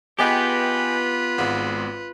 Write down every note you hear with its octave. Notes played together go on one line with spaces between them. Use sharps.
B3 F4 G4 G#4 B4 D#5 G5
G#1 G#2